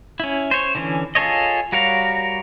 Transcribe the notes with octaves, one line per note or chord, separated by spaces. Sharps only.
C#4 E4
C5 C#5
D3 E3 C#4
F4 G#4 A4 C#5 D#5
G3 F#4 A#4 C#5 F5